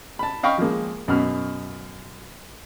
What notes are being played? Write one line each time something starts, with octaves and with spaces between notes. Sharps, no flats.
A5 B5
D#5 F5 G5 B5 C#6
F3 G#3 A#3
F#2 B2 F6